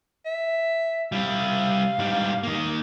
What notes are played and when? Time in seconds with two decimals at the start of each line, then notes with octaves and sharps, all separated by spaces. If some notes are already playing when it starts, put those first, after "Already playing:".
0.26 E5
1.12 G3 E4 F5
1.99 G#2 G3
2.43 D#3 A#3